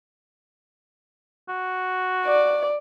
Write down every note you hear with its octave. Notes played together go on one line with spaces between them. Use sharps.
F#4
D5